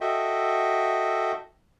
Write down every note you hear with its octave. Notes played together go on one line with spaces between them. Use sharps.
F#4 A4 D#5 E5 G5